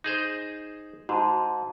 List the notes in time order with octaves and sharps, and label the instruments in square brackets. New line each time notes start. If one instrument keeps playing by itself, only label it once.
[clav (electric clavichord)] D#4 G#4 C5
[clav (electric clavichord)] G#2 [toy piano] F#4 A5